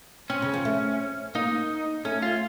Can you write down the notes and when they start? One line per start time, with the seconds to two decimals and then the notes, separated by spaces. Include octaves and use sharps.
0.30 C4 C#4
0.42 C#3
0.54 F3
0.65 A3
1.35 A#3 D#4
2.05 A3 C#4
2.22 F4